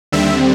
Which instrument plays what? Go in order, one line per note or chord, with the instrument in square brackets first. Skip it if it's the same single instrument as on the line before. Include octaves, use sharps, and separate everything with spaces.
[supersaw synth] D#2 D3 G3 C4 E5